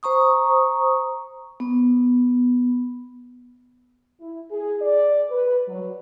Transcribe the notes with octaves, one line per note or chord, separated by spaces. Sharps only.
C5 A#5 C#6 D#6
B3
E4
G#4
D5
B4
F#3